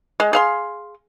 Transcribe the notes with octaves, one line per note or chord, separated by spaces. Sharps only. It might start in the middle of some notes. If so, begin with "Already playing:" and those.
G#3
G#4 F5 C6